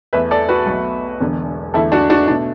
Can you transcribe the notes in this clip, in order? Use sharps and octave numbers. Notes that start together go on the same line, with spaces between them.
E2 E3 A3 B4 E5
A4 D5
F#4 B4
B1 B2 A3
E1 E2 D3
E2 D3 A3 E4 A4
D4 F#4
D4 F#4
B2 A3 D4